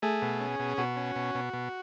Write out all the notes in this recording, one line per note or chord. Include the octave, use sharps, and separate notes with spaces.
A3 G#4
B2
C#4
B2
B2 F#4
C#4
B2
B2
B2